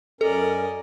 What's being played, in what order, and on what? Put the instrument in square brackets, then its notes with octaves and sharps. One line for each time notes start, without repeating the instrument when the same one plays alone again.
[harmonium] F#2 C#4 A#4 [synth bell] A4 [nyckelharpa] D5 D#5